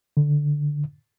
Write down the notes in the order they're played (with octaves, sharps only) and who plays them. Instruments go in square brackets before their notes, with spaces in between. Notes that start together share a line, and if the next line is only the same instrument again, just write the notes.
[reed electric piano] D3